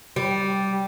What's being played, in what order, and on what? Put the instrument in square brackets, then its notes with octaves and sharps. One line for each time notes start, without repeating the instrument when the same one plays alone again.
[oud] G3